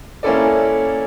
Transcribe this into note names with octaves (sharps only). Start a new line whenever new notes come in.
A#3 C#4 E4 A4 D5